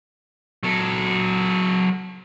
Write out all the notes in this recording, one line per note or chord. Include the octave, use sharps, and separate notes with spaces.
F#3 A4